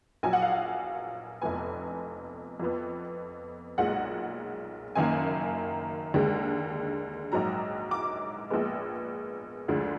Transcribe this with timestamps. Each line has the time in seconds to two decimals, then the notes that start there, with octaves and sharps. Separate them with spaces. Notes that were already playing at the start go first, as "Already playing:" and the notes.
0.23 A#1 A#2 F#3 G#5
0.33 F#5
0.42 F5
0.52 F#5
1.42 F1 F2 F3 B3 G#5
2.60 F2 F3 B3
3.78 B1 A#2 G#3 F#5
4.95 F#1 F#2 D#3 A#3 G#5
6.14 D#2 D3 G#3
7.32 A#1 G#2 F#3 A#5
7.91 D6
8.50 A#1 A#2 G#3 B3
9.68 D2 D3 F3 G#3